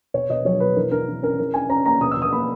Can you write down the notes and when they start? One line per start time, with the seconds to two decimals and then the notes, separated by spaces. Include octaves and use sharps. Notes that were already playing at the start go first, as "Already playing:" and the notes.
0.14 B2 C#5
0.29 B2 D#5
0.45 F#3 C#5
0.60 B2 B4
0.76 E3 A#4
0.91 E3 A#4
1.08 E3
1.23 C#4 A#4
1.39 E3 A#4
1.54 C#4 G#5
1.69 C#4 A#5
1.86 A#3 A#5
2.01 B2 D#6
2.11 E6
2.17 B2
2.22 D#6
2.32 A#3 B5